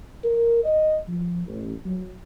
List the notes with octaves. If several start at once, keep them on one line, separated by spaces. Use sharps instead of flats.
A#4
D#5
F3
A1
F#3